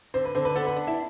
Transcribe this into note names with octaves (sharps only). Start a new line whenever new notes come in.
D3 C4 C5
B4
D3 C4 C5
B4
B3 A4
B4
D4
E4 E5